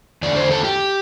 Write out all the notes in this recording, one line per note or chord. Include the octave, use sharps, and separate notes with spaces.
E2 D3 A3 D5
C5
A4
G4